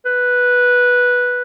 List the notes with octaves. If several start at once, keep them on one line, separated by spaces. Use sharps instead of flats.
B4